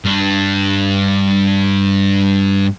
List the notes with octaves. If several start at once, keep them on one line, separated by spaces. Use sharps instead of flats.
G2 D4